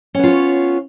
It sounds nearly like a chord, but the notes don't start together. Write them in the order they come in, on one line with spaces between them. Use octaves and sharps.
C#4 B3 F4 C#5